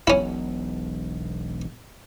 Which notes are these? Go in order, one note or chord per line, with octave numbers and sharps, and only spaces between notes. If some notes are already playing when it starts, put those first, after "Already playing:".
E1 B1 C#4 E4